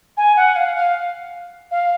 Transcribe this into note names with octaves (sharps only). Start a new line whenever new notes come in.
G#5
F#5
F5
F5
F5